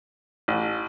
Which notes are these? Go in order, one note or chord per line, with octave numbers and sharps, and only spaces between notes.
A1